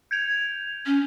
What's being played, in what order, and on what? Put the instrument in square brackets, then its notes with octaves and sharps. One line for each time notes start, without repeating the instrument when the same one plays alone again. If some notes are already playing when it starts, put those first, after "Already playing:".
[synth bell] G6 G#6 F7
[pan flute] C#4